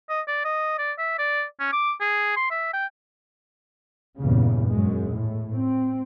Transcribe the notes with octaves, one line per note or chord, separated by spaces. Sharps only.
D#5
D5
D#5
D5
E5
D5
C#4
D6
G#4
C6
E5
G5
E2 G2 A#2 C#3
F#2 G#3
A2
C4